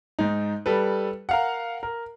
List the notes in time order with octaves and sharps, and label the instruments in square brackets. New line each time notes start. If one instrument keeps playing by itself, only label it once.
[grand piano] G#2 D#4
G3 A4 B4
A#4 F5 F#5
A#4